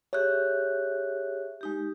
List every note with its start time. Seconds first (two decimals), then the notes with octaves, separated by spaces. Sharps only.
0.13 G4 G#4 C#5 E5 F#6
1.61 G#3 D#4 G4